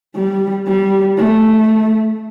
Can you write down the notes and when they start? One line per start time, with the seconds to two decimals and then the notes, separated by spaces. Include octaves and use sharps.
0.15 G3
0.67 G3
1.17 A3